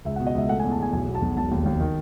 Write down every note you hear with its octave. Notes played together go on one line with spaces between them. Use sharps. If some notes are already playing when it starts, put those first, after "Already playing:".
C#2 E5
F#5
B2
D#5
C#2 E5
A3 F#5
G#5
E2
A5
E2 G#5
B1 G#5
B2
A5
B1
E1 A5
D#2
D#2
D#3